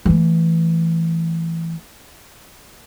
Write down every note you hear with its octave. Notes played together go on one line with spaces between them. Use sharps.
E3 A3